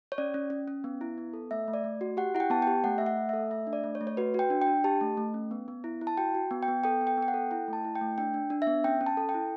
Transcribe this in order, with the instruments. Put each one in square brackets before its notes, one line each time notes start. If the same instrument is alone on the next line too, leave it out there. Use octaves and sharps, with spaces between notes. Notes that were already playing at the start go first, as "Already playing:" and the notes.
[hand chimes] C#5
C#4 D5
C#4
C#4
C#4
B3
E4
B3
A4
A3 E5
A3
D5
A3
F#4
G4 F#5
E4 F#5
G5
B3 A5
G5
G4
A3 F#5
A3 E5
F#5
A3
E5
A4
A3 E5
D4
D5
A3
C#5
A3
C#5
F#4 B4
F#4 G5
D4
G5
D4
G4 A5
A3
A3
C#4
B3
B3
E4
E4
A5
F#4 G5
F#4
B3
G5
B3
A4 G5
B3
G5
B3
G5
F#5
A4
E4 G5
A3
A5
E4
G5
A3
D4 G5
D4
D4
E5
B3
C#4 G5
C#4
A5
A4
G5
E4